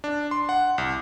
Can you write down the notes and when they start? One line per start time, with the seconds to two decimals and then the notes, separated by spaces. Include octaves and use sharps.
0.04 D4
0.31 C6
0.49 F#5
0.78 C2